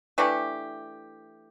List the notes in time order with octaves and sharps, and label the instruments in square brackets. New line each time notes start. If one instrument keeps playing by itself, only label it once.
[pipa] E3 A3 D4 G4